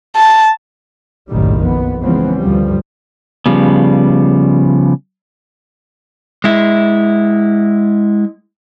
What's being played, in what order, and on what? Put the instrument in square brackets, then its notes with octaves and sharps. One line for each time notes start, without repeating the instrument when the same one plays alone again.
[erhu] A5
[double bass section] F#1 B1 A2 D#3 G3
F2 B3
C#3 E3 F3 G#3 B3 C4
D2 G2 F3 G3
[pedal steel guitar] C#3 F3 G3 B3
[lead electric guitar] G#3 E4